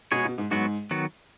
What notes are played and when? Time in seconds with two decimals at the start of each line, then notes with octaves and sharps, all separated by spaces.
0.12 B2 G#3 B3 G#4 C#5
0.25 B2
0.38 G#2
0.51 G#2 F#3 B3 F#4
0.91 D#3 F#3 B3 F#4